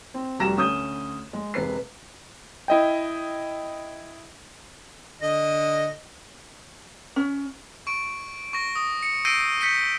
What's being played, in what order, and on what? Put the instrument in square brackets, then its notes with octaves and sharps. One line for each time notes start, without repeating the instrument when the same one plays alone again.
[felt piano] C4
F1 G3 F#4 A#5 A#6 E7
D2 C#4 D#6 G6
G#3
E1 C3 B4 C7
[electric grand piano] E4 D#5 G5
[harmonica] D3 D#5
[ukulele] C#4
[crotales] C#6 D7
C#6 A#6
D#6
C#7
E6 G6 A#6 C7 D7 D#7
G6 B6 C#7 D#7 G7